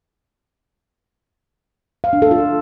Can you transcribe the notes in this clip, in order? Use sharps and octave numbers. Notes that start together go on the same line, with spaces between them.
F5
D4
A4
F4